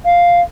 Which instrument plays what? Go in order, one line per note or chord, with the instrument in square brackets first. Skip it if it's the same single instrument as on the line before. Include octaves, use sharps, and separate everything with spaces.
[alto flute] F5